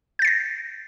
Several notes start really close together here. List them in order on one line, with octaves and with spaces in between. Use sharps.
G6 A6 C7 A#6